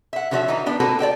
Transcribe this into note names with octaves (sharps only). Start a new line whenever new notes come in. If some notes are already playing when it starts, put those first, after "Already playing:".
E5 F#5
D3 F3 F#4 C5 C#5 E5
D#3 E3 D#4 F#4
B3 D4 G4
A#3 C4 F#4 A4 B4
D5 D#5 G5 A5